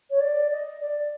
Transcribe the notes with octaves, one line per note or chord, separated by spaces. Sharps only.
C#5
D5
D#5
D5